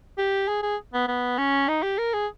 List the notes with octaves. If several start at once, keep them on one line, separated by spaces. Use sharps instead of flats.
G4
G#4
G#4
B3
B3
C#4
D#4
G4
A#4
G#4